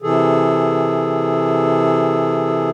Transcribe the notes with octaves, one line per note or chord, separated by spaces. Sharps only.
C3 E3 G#4 A4